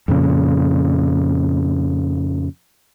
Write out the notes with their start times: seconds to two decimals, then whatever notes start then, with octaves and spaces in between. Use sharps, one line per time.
0.08 F2 A#2 C#3